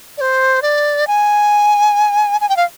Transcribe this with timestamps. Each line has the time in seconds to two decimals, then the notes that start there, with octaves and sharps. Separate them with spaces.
0.18 D5
0.21 C5
0.62 D5
1.07 G#5
2.41 G#5
2.49 G5
2.57 F5